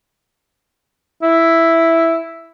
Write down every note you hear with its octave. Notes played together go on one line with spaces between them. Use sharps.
E4